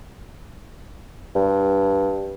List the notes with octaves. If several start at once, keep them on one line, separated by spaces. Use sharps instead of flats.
G2